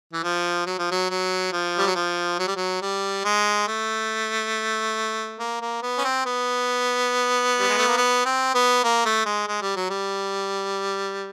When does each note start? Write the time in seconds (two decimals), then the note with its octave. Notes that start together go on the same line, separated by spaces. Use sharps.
0.13 E3
0.24 F3
0.67 F#3
0.79 F3
0.92 F#3
1.10 F#3
1.52 F3
1.78 G3
1.87 F#3
1.95 F3
2.39 F#3
2.48 G3
2.56 F#3
2.82 G3
3.25 G#3
3.68 A3
5.39 A#3
5.61 A#3
5.82 B3
5.98 C#4
6.04 C4
6.26 B3
7.59 G3
7.69 G#3
7.78 A3
7.88 A#3
7.97 B3
8.25 C4
8.54 B3
8.84 A#3
9.05 A3
9.26 G#3
9.48 G#3
9.62 G3
9.76 F#3
9.90 G3